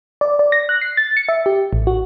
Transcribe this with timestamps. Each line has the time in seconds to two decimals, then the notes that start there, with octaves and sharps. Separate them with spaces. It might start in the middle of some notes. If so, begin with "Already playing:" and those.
0.21 D5
0.39 D5
0.52 A#6
0.69 F#6
0.81 C7
0.97 A6
1.17 C#7
1.29 E5
1.46 G4
1.73 A1
1.87 F#4